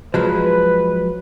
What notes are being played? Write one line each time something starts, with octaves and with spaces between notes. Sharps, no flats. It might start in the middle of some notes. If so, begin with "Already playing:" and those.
F3 F#3 G#3 B4